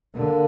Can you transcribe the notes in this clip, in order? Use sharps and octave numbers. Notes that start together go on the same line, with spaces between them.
D3 A#3